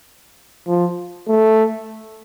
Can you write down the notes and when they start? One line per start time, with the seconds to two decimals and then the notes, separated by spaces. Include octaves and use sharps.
0.67 F3
1.28 A3